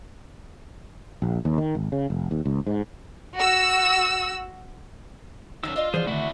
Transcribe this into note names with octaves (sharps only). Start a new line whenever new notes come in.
A#1
D#2
D#3
G#1
C#3
F1
D#2
C#2
G#2
F#4 E6
D#3 F#3 C#4 F5 E6
D4 F4 D#5 F5
B2 E3 F3 G3 G#4 C5
D3 D#3 A3 E4 F#4 D5 E5